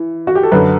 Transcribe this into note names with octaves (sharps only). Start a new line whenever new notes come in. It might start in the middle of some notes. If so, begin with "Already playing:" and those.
Already playing: E3
F#4
G4
A4
F#2 D3 B4